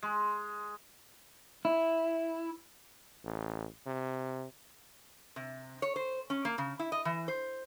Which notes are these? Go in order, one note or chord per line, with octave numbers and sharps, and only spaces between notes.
G#3
E4
A1
C3
C3
C#5
C5
C#4
A#3
C#3
E4
D#5
E3
C5